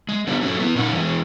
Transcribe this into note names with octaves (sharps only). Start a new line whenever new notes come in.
G#3
A3 B3 D4 G4
F#3 A3 C#4
B3 E4
A#2 C#4 D#4 F#5
E2 G#3